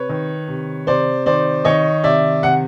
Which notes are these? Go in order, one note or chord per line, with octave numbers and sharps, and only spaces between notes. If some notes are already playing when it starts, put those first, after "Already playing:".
Already playing: C3 B4 C#5
D#3
C3
C3 C5 D5
D#3 C5 D5
D#3 C#5 D#5
C3 D5 E5
C3 F#5